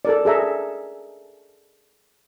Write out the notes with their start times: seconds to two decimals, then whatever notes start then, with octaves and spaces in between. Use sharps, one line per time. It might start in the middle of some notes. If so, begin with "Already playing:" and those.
0.05 A4 A#4 D5
0.25 G#4 A4 E5 A#5